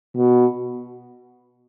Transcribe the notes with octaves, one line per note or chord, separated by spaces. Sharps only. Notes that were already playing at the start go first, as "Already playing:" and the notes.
B2